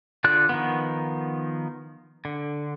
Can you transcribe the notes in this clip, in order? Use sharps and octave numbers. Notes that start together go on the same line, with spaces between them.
D3 F4 D5 F#6
D#3 F3 B3
D3